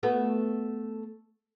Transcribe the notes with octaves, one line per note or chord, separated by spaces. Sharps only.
A3 B3 F#4